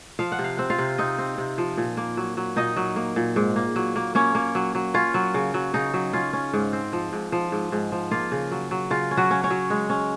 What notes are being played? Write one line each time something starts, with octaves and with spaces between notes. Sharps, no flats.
F3 F5
F#5
C3
F5
C4 F#5
F4 F5
C3
C4 D#4 D#5
C4
C3
F3
A#2
A#3
F#3
F#3
A#2 D#4 D#5
F#3
A#3
A#2
G#2
A#3
F#3
A#3
A#3 C#4 C#5
A#3
F#3
F#3
C#4 F4
F#3
C#3
F#3
C#3 D#4
F#3
C#4 F4
C#4
G#2
C4
F3
G#2
F3
G#2
G#2
F3
A#3 F4
C#3
F#3
F#3
C#3 F4
C#4
F#3 F#4
C#4
C#4 C#5
F#3
G#3
C#4